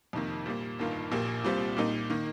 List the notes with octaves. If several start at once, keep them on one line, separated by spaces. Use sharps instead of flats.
F2 C3 D#3 A#3
A#2 G3 A#3
G1 G2 D#3 A#3 F4
A#1 A#2 A#3 G4
C2 A#2 G3 C4 F4
A#2 G3 A#3 D#4
D#3 A#3